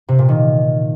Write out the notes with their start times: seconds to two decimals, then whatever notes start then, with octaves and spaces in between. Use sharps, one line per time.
0.08 C3
0.19 A#2
0.29 D#3